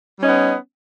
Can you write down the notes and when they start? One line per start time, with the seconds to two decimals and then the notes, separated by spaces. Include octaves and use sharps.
0.18 G3
0.22 C#4
0.25 D#4
0.28 B3